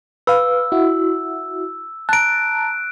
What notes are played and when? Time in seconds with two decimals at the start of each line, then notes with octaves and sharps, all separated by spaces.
0.27 B4 F5 E6
0.72 E4 F#4
2.09 A5 A#5 F#6 D7